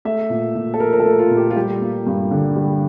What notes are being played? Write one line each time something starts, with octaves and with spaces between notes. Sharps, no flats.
A3 E5
A#2
A#2
A4
F3 A#4
A#4
A4
A3
F4
A#2
G4
F4
G3 G4
A#3
G2
D3
G3